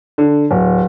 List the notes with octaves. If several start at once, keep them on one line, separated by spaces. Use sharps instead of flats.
D3
D1